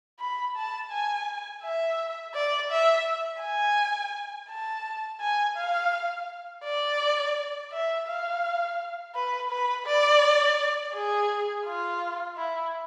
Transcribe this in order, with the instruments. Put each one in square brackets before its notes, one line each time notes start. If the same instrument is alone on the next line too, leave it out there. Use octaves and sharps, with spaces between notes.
[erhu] B5
A5
G#5
E5
D5
E5
G#5
A5
G#5
F5
D5
E5
F5
B4
B4
D5
G#4
F4
E4